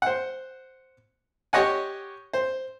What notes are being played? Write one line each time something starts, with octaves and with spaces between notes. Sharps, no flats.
C5 F#5
G4 C#5 D#5 F#5 G#5
C5